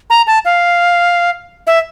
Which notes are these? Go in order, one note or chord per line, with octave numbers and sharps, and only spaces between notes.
A#5
A5
F5
E5